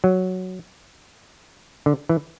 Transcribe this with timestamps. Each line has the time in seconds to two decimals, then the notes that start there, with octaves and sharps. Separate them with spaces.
0.04 F#3
1.86 D3
2.09 E3